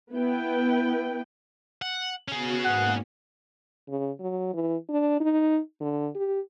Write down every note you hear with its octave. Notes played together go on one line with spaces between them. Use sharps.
B3 E4 B4 G5
F#5
B3 C#4 F#4 G#4
G#2 A#3 F#5
C#3
F#3
E3
D4
D#4
D3
G4